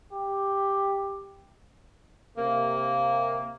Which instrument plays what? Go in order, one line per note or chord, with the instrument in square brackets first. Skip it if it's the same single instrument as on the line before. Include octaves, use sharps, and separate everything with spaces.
[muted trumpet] G4
[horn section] C3 A#3